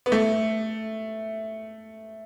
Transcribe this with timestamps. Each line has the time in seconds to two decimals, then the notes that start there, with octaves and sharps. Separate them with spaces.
0.06 B3
0.12 A3